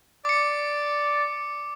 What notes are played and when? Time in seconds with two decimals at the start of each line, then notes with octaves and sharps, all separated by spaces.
0.25 D5 D6 C#7